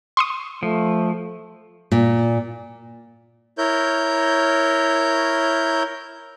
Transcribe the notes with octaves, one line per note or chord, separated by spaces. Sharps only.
C6 C#6 D#6
F3 A3
A#2
E4 A#4 C#5 G6